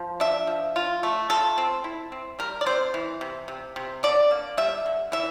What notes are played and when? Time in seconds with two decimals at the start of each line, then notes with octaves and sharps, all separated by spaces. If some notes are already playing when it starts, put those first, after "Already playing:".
Already playing: F3
0.20 D4 E5
0.47 F3
0.76 F4
1.03 A3
1.30 F4 A4
1.58 C4
1.84 E4
2.12 C4
2.39 G3 A#4
2.61 D5
2.66 C4 C5
2.94 E3
3.21 C3
3.48 C3
3.76 C3
4.03 D3 D5
4.31 A#3
4.57 G3 E5
4.86 D3
5.12 E3 E5